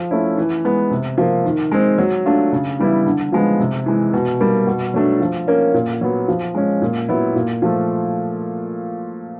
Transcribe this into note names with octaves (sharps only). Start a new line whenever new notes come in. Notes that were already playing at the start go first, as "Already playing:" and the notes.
Already playing: F3
A3 C#4 E4
E3
G#3 B3
C3
F3 A#3
D#3
G#3 C4
F#3
A3 D4 F4
C#3
E3 G3 B3 E4
D3
F3 G#3 B3
C3
E3 G#3
B2
G3 A#3
B2
F#3 A3 D4
F3
A#3 C#4
A#2
F#3 B3
F3
G#3 C#4
A#2
F#3 B3 E4
A#2
F3 A3